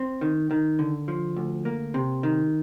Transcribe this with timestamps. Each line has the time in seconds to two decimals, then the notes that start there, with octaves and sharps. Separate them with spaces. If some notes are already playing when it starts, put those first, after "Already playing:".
Already playing: C4
0.21 D#3
0.51 D#3
0.79 D3
1.08 F3
1.36 D2
1.65 A#3
1.94 C3
2.23 D#3